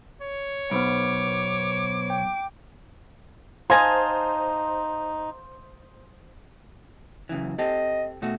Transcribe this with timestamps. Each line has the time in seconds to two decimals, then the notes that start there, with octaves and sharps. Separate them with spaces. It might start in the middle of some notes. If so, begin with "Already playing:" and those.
0.22 C#5
0.71 B1 B3 C5 B5 D6
2.10 G5
3.70 D#4 C5 F5 G#5 A5 C6 D#6 A#6
7.29 F#2 C#3 E3
7.59 C4 G4 A4 D#5
8.22 B2 A3 F#4